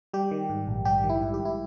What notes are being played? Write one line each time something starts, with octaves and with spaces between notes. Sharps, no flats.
G3 G4
D#3
G#2
A#1
G3 G4
D#3
E4
G#2
G4
A#1
E4